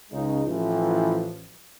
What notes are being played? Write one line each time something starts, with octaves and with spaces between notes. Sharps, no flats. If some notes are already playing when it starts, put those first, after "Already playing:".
C#2 C#3 G#3 D#4
A1 E3 F3